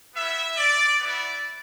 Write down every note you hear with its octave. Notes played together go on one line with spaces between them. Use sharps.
B3 E4 E5
D5
B3 E4 D5